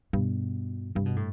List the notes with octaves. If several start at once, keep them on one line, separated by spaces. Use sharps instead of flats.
G2 B2
G2 C3
B2
A2